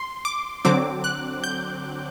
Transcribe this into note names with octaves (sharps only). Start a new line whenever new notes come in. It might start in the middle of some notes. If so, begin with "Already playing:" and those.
Already playing: C6
D6
D3 F#3 C4 D6
F#6
G6